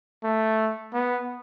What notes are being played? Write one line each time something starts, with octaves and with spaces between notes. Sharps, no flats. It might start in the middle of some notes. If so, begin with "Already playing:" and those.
A3
B3